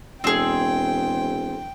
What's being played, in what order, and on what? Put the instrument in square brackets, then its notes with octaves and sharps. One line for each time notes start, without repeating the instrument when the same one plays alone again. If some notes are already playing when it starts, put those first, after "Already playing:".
[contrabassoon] E1 [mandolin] C4 G#4 [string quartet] G5